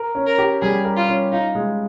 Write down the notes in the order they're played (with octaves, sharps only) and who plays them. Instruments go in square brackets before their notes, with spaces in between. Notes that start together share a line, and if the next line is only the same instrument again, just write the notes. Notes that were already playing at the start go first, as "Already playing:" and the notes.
Already playing: [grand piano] A#4
C#4
[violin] A#4
[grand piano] G4
[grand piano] G3 [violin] G#4
[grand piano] A#4
[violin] F4
[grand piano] C#4
[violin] D#4 [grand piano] F4
[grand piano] G#3